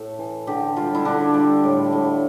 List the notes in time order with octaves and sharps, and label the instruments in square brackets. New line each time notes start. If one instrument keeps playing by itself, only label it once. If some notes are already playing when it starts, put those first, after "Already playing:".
Already playing: [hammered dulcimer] A2 A3
E3
D3 G4
G3 F4
E4
D3 D4
G3
A2
A2